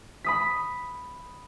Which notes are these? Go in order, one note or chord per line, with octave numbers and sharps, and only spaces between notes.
B5 D#6 B6